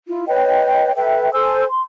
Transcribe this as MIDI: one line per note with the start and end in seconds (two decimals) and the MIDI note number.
0.07 0.24 64
0.07 0.24 65
0.28 0.92 71
0.28 0.92 73
0.28 0.92 75
0.28 0.92 79
0.95 1.32 69
0.95 1.32 71
0.95 1.32 76
0.95 1.32 79
1.33 1.64 69
1.33 1.64 72
1.33 1.64 80
1.33 1.64 88
1.69 1.82 84